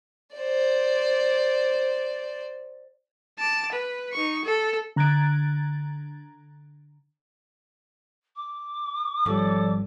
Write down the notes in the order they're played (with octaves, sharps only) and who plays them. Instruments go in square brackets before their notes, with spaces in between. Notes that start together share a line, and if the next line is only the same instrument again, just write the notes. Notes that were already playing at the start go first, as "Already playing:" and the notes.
[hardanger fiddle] C5 D5
[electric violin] A5 D6
B4
D#4 C#6
A4
[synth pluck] D3 A#5 F#6 G#6 A6 D7
[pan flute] D6
[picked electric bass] G#1 G3 [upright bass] F3 [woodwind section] A4 C#5 D5